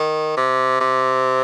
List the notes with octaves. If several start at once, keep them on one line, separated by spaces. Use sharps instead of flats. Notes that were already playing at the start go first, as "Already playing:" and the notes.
Already playing: D#3
C3
C3